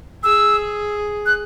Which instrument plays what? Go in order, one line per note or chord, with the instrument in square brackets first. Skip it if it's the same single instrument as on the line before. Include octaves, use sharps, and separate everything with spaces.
[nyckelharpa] G#4 [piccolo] E6
[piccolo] F#6